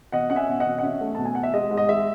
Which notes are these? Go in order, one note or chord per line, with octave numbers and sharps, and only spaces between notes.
B2 D#5 F#5
C#4 F#5
E5 G#5
B2
D#5 F#5
B2
F#5
C#4 E5
A3
B2 A5
G#5
B2 F#5
E5
G#3 D#5
G#2
D#5
G#3 E5